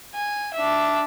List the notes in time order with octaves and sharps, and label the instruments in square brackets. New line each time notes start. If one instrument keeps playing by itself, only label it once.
[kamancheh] G#5
D4 E5